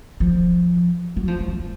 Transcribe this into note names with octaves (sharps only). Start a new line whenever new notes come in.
F3
F#3
F3
F#3
F3